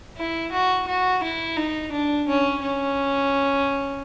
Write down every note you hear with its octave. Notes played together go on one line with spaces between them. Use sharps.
E4
F#4
F#4
E4
D#4
D4
C#4
C#4